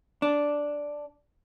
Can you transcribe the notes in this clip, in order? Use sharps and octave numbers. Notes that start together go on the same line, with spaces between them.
D4